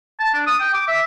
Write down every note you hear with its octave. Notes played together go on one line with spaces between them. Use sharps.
A5
D4
D#6
G5
D6
E5